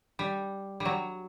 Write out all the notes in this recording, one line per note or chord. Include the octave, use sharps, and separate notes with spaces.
G3
G3
F#3